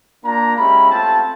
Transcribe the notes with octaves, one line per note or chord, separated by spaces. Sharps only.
A#3 D4 F4 A#5
G#3 C#4 E4 G4 B5
A3 C4 F4 A5